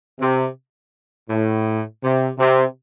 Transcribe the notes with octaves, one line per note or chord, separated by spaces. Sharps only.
C3
A2
C3
C3